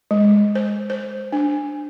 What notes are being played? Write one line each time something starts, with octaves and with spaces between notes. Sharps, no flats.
G#3
C5
C5
D4